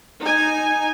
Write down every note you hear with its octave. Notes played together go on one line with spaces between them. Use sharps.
D#4 G#5